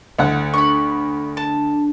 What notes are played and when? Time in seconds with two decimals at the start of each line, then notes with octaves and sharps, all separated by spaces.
0.19 D2 F#5
0.54 D4 B5 C#6
1.37 A5